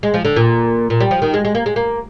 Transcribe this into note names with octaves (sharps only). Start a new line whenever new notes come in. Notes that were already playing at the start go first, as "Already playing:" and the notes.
G#3
F3
D3
A#2
A#2
G3
F3
D#3
G#3
G#3
A#3
G#3
A#3